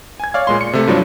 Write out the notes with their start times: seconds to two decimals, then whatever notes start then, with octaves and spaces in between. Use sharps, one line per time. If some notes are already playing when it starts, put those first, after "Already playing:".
0.20 G#5 G#6
0.34 C#5 D5 F5
0.47 A#2 G#3 C6
0.61 C#7
0.73 C3 A3
0.87 G2 F3 F#3 D4